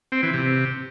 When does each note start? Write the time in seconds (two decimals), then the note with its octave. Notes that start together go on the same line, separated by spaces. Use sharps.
0.12 C4
0.23 E3
0.34 C3